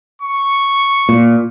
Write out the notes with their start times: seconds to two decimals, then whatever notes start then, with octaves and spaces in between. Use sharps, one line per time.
0.22 C#6
1.09 A#2